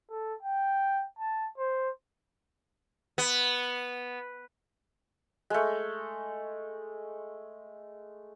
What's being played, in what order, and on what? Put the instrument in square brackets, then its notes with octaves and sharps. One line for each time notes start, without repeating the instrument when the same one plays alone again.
[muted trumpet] A4
G5
A5
C5
[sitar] B3
[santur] G#3 A3